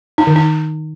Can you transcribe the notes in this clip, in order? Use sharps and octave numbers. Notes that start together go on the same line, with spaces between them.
D#4
D#3
D#4